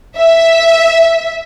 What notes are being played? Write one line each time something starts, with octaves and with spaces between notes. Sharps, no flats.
E5